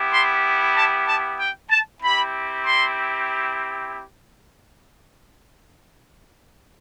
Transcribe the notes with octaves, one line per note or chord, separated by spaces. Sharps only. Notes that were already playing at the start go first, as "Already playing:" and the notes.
Already playing: B3 E4 G4
C6
A5
A5
G5
A5
C4 E4 G4 B5
C6